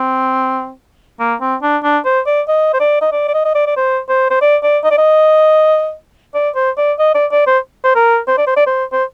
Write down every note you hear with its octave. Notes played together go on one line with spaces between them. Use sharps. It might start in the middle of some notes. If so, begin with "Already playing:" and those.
Already playing: C4
A#3
C4
D4
D4
C5
D5
D#5
C5
D5
D#5
D5
D5
D#5
D#5
D5
D5
C5
C5
C5
D5
D5
D#5
D5
D#5
D5
C5
D5
D#5
D5
D5
C5
C5
A#4
C5
D5
C5
D5
C5
C5